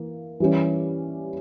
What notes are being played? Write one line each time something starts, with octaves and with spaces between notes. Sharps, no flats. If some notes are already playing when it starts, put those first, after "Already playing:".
Already playing: E3 A#3
E3 G3 C#4